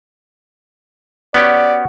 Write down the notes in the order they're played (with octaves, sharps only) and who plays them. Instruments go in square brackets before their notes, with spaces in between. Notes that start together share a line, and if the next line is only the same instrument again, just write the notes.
[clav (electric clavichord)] B3 C#4 G4 [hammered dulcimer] F#4 [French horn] D5